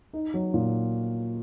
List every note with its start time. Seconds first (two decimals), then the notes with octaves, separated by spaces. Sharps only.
0.13 D#4
0.34 F#3
0.54 A#2